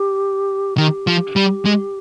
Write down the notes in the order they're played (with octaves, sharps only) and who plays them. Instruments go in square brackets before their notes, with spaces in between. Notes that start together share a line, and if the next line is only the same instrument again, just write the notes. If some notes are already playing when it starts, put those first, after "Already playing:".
Already playing: [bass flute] G4
[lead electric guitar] D#3 [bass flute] G4
[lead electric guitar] F3
G3
G#3